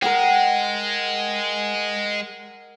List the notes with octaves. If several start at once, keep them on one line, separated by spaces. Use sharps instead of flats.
G#3 A#4 F#5 G5